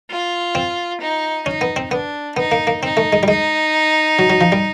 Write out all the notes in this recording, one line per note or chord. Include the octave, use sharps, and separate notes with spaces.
F4
C4
D#4
C#4 D#4
B3
C4
B3 D4
B3 D#4
A#3
A#3
C4 D#4
A3
G#3
G3
G#3 D#4
F#3
F#3
F3
G3